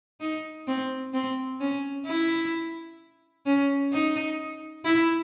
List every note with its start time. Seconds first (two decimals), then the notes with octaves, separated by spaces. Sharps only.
0.21 D#4
0.67 C4
1.14 C4
1.61 C#4
2.06 E4
3.46 C#4
3.93 D#4
4.85 E4